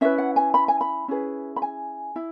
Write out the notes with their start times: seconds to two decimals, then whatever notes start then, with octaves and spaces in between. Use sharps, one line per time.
0.01 C#4 E4 B4 E5
0.18 F#5
0.36 G#5
0.54 B5
0.68 G#5
0.81 B5
1.08 C#4 E4 G#4 B4
1.56 B5
1.62 G#5
2.16 E4